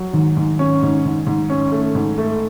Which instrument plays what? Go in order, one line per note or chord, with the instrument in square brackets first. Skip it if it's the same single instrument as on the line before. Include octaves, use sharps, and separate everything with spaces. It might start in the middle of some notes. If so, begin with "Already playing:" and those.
Already playing: [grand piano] F#3
[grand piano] G#2 [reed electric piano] D#3
[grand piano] G#2
C#4
G#2
G#2
G#2
C#4
A3
G#2
A3